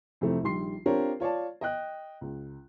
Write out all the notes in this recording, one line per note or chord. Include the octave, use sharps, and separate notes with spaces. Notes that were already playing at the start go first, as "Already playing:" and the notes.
F2 C3 E3 A3 C4
A#1 D#3 G3 C6 C7
C4 D4 F4 G4 A#4 C#5
F4 C#5 D5 A5
D#5 G5 F#6
C#2